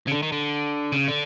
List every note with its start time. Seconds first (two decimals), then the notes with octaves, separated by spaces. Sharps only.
0.07 C#3
0.11 D3
0.22 D#3
0.32 D3
0.92 C#3
1.08 D3